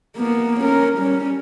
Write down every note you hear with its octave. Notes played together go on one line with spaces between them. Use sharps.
A#3 B3
C#4 A#4
G3 C#4